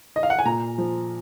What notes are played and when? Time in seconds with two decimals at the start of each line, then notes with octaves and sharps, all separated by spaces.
0.16 D#5
0.23 F5
0.30 F#5
0.39 G#5
0.45 A#2 A#5
0.78 F3